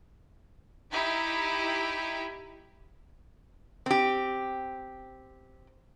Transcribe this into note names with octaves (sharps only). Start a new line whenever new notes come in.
D#4 E4 G4
C4 G4